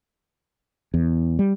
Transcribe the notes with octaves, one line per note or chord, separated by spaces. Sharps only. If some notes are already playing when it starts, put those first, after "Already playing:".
E2
G3